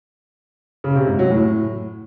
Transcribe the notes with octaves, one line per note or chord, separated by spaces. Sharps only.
C#3
C3
G#2
F#3
A2